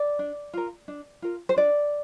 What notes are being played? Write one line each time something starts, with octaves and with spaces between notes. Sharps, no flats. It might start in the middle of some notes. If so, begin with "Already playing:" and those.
Already playing: D5
D4
F4 A#4
D4
F4 A#4
C5
D4 D5